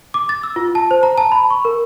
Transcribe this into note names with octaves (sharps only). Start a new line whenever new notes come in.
D6
A6
E6
F4
A5
C5
A#5
A5
B5
C#6
A#4